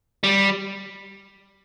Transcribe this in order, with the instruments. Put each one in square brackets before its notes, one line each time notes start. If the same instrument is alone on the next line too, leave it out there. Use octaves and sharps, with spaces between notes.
[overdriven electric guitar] G3